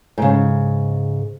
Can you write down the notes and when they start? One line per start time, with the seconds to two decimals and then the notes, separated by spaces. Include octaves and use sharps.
0.18 G#2 C#3